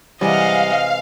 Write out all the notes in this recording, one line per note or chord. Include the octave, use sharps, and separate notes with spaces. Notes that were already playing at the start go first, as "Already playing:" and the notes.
C3 E3 G3 G#3 D#5 F5 F#5